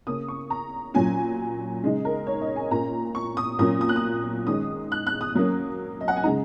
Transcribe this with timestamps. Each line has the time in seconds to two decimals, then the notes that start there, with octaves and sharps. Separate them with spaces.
0.07 C#3 A#3 C#4 D#6
0.28 C#6
0.50 A#5
0.94 A#2 F#3 C#4 G#5
1.83 C#3 G#3 D#4
2.05 A#4
2.27 C#5
2.41 D#5
2.56 G#5
2.71 A#2 A#3 C#4 A#5
3.15 C#6
3.37 D#6
3.59 A#2 F#3 A#3 C#4 D#6
3.81 D#6
3.89 F#6
3.96 D#6
4.47 D#3 G#3 C#4 D#6
4.92 F#6
5.07 F#6
5.21 D#6
5.35 F#3 A#3 C#4
6.01 D#5
6.08 F#5
6.16 G#5
6.23 C#3 G#3 D#4 A#5